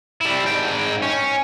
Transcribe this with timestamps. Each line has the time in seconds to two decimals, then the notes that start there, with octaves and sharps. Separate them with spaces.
0.21 G3 E4
0.47 G#2 G5
1.03 C#4